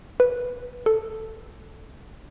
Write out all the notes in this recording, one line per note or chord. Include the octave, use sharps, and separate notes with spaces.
B4
A4